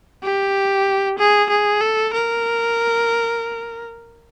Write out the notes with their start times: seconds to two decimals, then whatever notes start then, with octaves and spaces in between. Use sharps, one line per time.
0.23 G4
1.19 G#4
1.50 G#4
1.81 A4
2.14 A#4